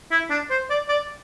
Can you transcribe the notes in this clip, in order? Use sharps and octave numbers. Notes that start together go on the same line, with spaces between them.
E4
D4
C5
D5
D5